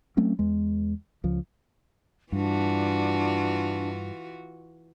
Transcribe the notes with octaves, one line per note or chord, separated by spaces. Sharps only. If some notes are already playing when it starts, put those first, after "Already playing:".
F#3 A3 C4 C#4
E2 G#3
C#2 F3
G2 E3 D4 F4 F#4